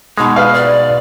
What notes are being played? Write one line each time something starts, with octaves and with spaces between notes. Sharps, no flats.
B2 G#3 D#4
B4 F5
D5